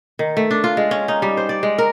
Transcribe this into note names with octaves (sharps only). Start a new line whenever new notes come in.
D#3
A3
D4
F4
G#3
C#4
D#4
G3
C5
D5
G#3
A#4